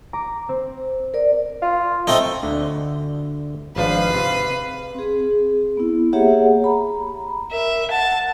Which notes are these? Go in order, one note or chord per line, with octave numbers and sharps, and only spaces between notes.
A#5 D6
C4
A#4 D5
F4
A3 C4 D#4
D2 D3
G#1 G#2 F3 D4 B4 F5
C3
C4 G#4
B3 E4
A#3 G4 G#4 C#5 E5 F#5
A#5 B5
A#4 E5
F#5 A5